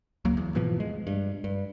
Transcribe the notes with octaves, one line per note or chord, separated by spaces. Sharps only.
C#2 F#3 A#3
E2
G#2 B2 E3 F3
G#3
G2
G2